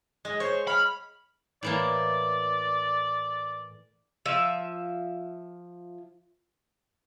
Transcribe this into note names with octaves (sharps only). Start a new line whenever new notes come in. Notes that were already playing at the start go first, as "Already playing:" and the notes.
G#3 D#5
C5 C#5
B5 F6
A2 E3 A#3 D5
F3 E5